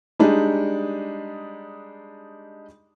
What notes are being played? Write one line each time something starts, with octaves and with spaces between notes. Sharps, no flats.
G3 G#3 D4 D#4